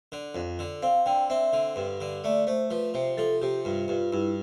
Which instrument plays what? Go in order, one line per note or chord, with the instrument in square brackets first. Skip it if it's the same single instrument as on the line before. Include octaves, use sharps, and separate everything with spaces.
[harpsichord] D3
F2
D3
[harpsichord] C4 [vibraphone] F5
[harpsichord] D3 [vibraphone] G5
[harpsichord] C4 [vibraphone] E5
[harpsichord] D3
G2
D3
[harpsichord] A3 [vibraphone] D5
[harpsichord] A3 [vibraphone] C5
[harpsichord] F3 [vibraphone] B4
[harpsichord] C3 [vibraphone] C5
[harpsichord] F3 [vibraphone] A4
[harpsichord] C3 [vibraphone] G4
[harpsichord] G2 [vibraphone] F4
[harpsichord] G2 [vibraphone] F4
[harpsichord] G2 [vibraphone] E4